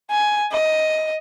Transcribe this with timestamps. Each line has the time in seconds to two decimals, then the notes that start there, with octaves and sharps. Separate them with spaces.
0.10 G#5
0.52 D#5